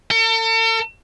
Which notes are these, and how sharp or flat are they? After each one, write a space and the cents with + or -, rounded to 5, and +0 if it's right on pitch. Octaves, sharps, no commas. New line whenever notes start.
A4 +45